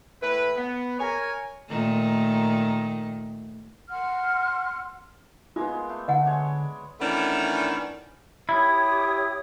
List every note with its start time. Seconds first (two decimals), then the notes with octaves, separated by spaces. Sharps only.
0.21 A2 E4 B4
0.56 B3
0.99 A#4 C#5 G#5
1.69 A#2 D#3 A3
3.89 F#5 C6 F6
5.56 G#3 A#3 B3 F4
5.89 A3
6.08 D3 D#5 F#5 G#5
6.25 G#3 C#5 D5
7.00 D#3 E3 A3 B3 C#4 D4
8.49 E4 G4 C#5 D#6